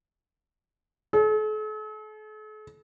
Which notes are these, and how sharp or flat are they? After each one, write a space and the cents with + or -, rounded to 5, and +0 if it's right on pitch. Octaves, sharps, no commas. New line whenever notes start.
A4 -45